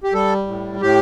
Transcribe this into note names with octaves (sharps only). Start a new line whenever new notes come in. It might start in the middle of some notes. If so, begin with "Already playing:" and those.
G4
G3 A4
A2
A2 G4